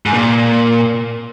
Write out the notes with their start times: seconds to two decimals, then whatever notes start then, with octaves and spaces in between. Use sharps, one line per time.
0.06 G#2
0.14 A#2